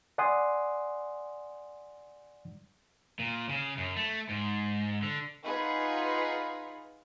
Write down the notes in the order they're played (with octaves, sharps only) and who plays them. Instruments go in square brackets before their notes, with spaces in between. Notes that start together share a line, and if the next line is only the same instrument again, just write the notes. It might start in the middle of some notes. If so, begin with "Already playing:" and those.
[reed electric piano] D5 F#5 G#5 C6 D#6
[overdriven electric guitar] A#2
C#3
F#2
A3
G#2
D3
[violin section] D#4 F4 G#4 B4 F#5 B5